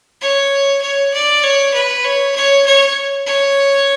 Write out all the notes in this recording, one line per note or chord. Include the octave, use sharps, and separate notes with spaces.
C#5
C#5
D5
C#5
B4
C#5
C#5
C#5
C#5